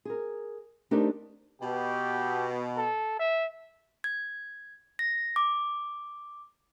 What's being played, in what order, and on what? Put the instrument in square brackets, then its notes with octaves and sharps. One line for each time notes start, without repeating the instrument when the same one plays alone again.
[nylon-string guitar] G#4 A#4
A3 C4 D4 D#4 G4 A#4
[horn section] B2 [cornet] G4
[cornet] A4
E5
[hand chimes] G#6
A#6
D6